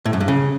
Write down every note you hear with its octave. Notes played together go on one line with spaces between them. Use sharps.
A2
F#2
G2
C#3